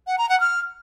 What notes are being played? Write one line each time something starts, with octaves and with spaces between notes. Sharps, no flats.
F#5
A#5
F#5
F6